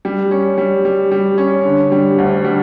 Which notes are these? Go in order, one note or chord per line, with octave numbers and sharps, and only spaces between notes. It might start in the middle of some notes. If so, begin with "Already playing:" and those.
G3
C#4
G3
G3
G3
C#4
D3
G3
D2
G3